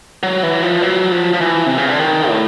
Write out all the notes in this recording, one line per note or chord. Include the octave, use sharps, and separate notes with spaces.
F#3
E3
F3
F#3
F3
F3
E3
C3
C#3
D3
D#3
A2